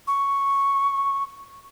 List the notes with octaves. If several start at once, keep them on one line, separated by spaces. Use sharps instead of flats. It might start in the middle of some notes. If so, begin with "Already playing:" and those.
C#6